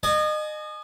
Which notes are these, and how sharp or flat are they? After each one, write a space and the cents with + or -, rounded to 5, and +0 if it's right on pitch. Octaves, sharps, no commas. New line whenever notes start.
D#5 -30 G#5 +30